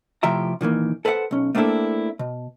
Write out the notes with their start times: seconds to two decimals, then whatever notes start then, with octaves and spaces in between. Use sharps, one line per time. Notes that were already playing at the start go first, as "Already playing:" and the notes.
0.23 A2 C3 F3 G4 E5 A#5
0.61 A#2 D#3 E3 A#3
1.05 A4 B4 C5 F5 F#5
1.31 B1 C#4
1.55 A3 A#3 C4 D4 E4 A4
2.19 B2